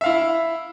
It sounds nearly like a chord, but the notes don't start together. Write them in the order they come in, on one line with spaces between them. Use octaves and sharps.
E5 F5 E4